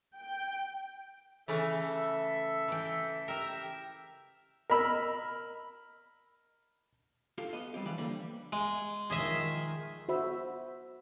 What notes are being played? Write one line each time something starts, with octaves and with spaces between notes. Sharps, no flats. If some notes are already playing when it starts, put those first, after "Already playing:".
G5
C#3 E3 A3 A4 E5
E3 G5
G4 A#4 E5 E6
A#4 D#5 B5 E6
F4 G4 A4
B3 D#5
G3 G#3 C4 G4
E3 F3 G3 G4 B4
D3 E3 F3 G3 A#3
G#3
D#3 F3 G#4 D#5 E5
F#4 C5 E5 B5